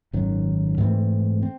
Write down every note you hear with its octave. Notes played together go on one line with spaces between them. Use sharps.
G#1 F#2 D#3
G#2 E3 A3 C4
C4